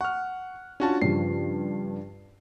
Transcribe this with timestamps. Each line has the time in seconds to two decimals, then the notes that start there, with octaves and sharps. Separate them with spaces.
0.01 F#5 C#6 F6
0.80 C#4 D4 F4 F#4 A5
1.02 G2 C#3 F3 C7